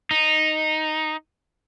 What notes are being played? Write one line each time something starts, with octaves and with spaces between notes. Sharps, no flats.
D#4